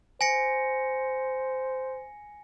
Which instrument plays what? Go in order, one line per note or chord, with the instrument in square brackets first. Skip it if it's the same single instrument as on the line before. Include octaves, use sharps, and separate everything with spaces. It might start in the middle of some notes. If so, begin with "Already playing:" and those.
[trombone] C5 [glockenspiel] G#5 A#6 C#7